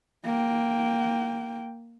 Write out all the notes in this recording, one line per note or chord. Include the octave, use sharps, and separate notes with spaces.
A#3 G5